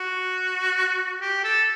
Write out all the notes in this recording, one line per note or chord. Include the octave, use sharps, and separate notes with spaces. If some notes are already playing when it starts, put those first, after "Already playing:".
Already playing: F#4
G4
A4